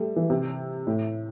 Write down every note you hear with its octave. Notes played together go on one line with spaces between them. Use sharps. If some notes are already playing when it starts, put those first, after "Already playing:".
Already playing: G3 A3
E3
C3
A2